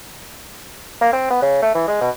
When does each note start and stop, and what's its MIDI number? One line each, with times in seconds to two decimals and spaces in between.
1.01 1.12 58
1.13 1.27 60
1.30 1.40 59
1.42 1.61 49
1.62 1.74 57
1.75 1.87 52
1.88 1.98 56
2.01 2.10 47